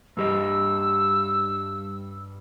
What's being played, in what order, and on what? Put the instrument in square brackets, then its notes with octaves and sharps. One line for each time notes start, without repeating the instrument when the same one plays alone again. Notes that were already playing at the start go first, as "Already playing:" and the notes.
[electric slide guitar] G2 G3 D#5 [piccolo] E6